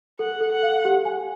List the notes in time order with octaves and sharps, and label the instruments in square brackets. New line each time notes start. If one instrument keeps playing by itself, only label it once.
[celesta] A4 [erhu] F#5
[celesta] A4
[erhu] F#5
[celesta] F5
G4
G#5